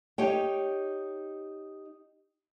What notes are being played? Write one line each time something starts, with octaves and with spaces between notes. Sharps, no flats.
D#4 G4 C#5 G5